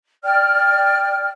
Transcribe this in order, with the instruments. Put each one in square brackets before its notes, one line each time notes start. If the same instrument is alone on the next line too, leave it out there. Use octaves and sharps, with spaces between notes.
[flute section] D5 G5 F6